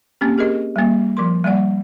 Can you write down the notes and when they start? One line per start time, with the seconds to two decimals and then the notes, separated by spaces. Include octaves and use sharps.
0.21 A#3 C4 C#4 G4
0.38 G4 G#4 A#4 D#5
0.76 G3 A#3
1.17 F3 A#4 C6
1.44 G3 A#3 D5 F#5